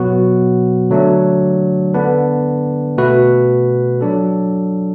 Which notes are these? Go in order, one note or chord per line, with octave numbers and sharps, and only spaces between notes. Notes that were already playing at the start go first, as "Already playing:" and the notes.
Already playing: B2 F#3 B3 F#4
D3 F#3 A3 D4
D3 B3 D4 B4
B2 A3 F#4 B4
F#3 D4 A4